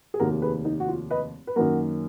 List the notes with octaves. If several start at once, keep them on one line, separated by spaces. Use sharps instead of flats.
G#4
F1 D#2 D#3 A#3 F#4 A#4
G#4 B4
D#4
F#4
F4
B4 D#5
B4
F#2 D#3 F#3 A#3 F#4 A#4